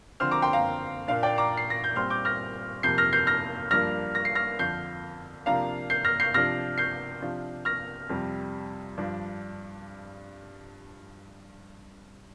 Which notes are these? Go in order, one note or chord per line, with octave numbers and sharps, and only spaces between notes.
D3 F3 C4 C6 F6
A#5 D6
G5 C6
F5 A#5
A#2 A#3 D4 F5
D5 G5
A#5 D6
C7
A#6
G6
A#2 G3 C4 C6 F6
D6 G6
F6 A#6
F2 C3 A#3 G6 C7
F6 A#6
G6 C7
F6 A#6
G2 F3 A#3 D4 F6 A#6
A#6
C7
F6 A#6
F2 D3 F3 D4 G6 C7
C3 F3 A#3 D4 F5 A#5
G6 C7
F6 A#6
G6 C7
C3 F3 D4 F6 A#6
G6 C7
C3 F3 D4
F6 A#6
F2 C3 G3
G2 F3 D4